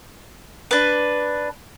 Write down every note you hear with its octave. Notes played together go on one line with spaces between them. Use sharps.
D4 B4